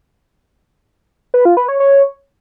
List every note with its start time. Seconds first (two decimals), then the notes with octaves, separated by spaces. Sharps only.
1.34 B4
1.45 F4
1.57 B4
1.68 C#5
1.80 C#5